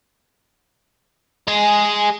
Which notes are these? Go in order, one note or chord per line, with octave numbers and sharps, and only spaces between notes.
G#3 G#4